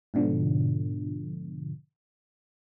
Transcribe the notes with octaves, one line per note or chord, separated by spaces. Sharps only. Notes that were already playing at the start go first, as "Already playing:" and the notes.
G#2 B2 D3 F3